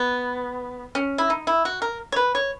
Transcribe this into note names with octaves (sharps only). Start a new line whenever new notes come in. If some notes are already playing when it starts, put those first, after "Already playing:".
Already playing: B3
C#4
E4
D#4
E4
F#4
A#4
C#5
B4
C#5